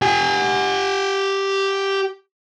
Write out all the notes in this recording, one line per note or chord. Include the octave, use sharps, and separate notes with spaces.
G4 G#5